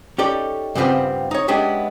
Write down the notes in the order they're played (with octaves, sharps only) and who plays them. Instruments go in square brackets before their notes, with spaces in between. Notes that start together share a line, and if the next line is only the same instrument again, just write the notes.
[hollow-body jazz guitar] C#4 D#4 G4 A4 D5
G2 C#3 G3 B3 C4 F4
D#4 C#5
G#3 B3 C#4 D4 E4 G4